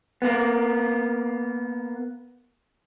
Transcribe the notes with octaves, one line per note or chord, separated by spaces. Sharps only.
A#3 B3